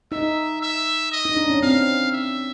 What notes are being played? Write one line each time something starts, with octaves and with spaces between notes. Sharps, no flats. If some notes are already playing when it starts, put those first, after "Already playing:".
D#4 E5
E5
D#5
D#4
D4
C#4
C4 F5
E5